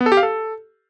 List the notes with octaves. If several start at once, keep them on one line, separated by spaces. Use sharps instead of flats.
B3
A4
G4
F5
A4